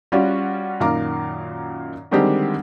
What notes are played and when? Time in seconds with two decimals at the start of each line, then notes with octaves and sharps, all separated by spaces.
0.12 G3 C#4 F4 F#4 D5 F#5
0.80 F#2 A#2 D#3 F5 A#5 D6
2.11 D3 D#3 G3 G#3 C4 G4